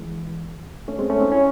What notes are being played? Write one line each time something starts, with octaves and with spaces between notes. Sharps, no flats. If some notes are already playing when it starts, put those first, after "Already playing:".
Already playing: E3 G#3
A3 C#4
G#3 C4
A3 C#4
C4 D#4
C#4 E4